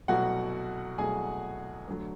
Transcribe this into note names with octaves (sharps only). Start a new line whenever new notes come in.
C2 B2 F#3 A3 F#4 F#5
C2 B2 F#3 A3 G#4 G#5
D2 D3 F#3 A3